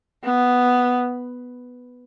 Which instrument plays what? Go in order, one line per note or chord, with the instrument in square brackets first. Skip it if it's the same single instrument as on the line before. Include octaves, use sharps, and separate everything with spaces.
[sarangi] B3